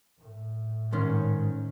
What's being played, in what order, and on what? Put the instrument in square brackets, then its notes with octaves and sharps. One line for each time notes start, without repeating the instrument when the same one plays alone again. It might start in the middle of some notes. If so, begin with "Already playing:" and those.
[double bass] A2
[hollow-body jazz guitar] G#2 D#3 C#4